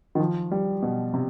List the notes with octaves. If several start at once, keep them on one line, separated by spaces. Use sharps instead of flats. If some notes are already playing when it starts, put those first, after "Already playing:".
D#3
F3
G3
B2
C3